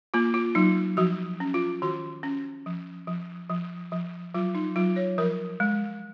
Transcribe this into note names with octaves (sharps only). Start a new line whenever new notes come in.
A#3 F4
F4
F#3 D#4
F3 F#4
C#4
F4
D#3 F#4
C#4
F3
F3
F3
F3
F#3 F4
D#4
F#3 F4
C#5
F3 A#4
G#3